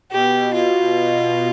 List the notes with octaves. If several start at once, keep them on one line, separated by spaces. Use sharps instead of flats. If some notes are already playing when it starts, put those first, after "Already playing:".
B2 G4
F4